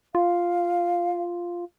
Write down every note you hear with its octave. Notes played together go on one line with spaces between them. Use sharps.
F4 F5